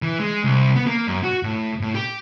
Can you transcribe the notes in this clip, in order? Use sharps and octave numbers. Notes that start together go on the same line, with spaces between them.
E3
G#3
C2
B3
A#3
F#2
F#4
A2
A2
G4